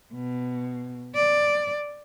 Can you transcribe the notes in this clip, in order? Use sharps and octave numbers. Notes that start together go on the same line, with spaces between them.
B2
D5